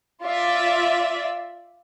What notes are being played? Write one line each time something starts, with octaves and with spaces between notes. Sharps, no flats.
F4 D5 E5